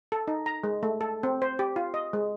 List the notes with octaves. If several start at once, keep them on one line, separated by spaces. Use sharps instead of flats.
A4
D#4
A#5
G#3
A3
A4
C4
C5
G4
F4
D#5
G#3